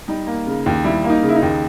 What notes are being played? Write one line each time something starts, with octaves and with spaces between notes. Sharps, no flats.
G3 D#4
A#3
C#3
D#2
G3 E4
A#3
D#4
C#3
E4
D#4
D#2